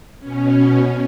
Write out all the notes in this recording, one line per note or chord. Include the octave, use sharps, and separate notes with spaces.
B2 C#4